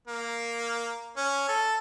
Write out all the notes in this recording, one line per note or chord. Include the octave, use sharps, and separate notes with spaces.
A#3
C#4
A4